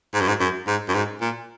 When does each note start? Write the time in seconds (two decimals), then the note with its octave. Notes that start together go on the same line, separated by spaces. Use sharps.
0.14 G#2
0.21 F#2
0.28 G#2
0.40 F#2
0.67 G#2
0.89 F#2
0.94 G#2
1.21 A#2